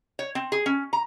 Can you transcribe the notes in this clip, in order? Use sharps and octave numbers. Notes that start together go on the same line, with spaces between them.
C#5
C4
G#4
C#4
A#5